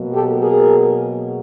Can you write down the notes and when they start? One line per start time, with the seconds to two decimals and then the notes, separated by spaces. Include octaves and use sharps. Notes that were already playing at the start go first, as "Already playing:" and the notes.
Already playing: B2 F#3 A#3
0.13 G4 A4
0.41 G#4 A#4